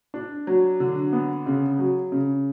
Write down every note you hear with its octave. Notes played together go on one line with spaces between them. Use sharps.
D4
F#3
D3
B3
C#3
F#3
C#3